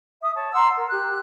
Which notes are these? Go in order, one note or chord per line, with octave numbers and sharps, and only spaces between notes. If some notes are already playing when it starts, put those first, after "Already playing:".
E5 D#6
C#5 A5
F#5 A#5 C6 E6
A#4
G4 F#6